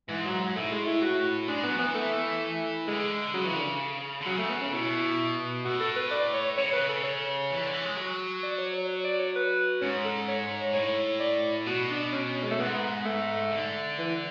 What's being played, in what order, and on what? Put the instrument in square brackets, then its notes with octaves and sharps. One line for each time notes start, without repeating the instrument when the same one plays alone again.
[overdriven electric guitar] G#2 [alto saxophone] E3
[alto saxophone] F#3
F#3
[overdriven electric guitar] A2 [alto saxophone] A3
[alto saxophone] G#3
E4
F#4
[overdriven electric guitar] G#3 [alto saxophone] D4
[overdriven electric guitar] F#3 [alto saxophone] B3
[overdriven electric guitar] E3 [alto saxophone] B3
[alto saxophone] A3
[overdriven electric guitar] D3 [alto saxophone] G#3
[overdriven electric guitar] C#3 [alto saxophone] F#3
[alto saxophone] E3
D3
[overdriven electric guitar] D3
[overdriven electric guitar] C#3 [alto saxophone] F#3
[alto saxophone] A3
B3
C#4
[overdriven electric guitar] B2 [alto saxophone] E4
[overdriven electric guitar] A2 [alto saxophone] F#4
[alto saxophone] A4
B4
D5
C#5
[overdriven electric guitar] C#3 [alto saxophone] C#5
[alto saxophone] B4
A4
C#5
[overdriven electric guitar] E3
D3
E3
G#3
F#3
[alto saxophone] D5
C#5
C#5
C#5
D5
C#5
B4
[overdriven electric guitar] G#2 [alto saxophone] C#4
[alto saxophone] A4
C#5
[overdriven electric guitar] A2 [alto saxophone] C#5
[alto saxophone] D5
[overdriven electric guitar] B2 [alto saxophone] F#4
[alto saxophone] D4
C#4
G#3
A3
[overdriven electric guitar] G#2 [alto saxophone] B3
[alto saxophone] A3
[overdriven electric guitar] D3
[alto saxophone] E3